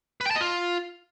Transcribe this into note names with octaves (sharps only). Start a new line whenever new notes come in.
B4
G5
A5
D#5
F4